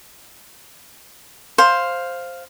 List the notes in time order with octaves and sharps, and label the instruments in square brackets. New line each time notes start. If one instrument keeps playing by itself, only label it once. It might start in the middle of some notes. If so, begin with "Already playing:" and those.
[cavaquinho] C5 F5